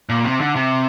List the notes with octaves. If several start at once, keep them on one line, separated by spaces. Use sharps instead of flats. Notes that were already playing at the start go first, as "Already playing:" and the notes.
A#2
C3
D3
C3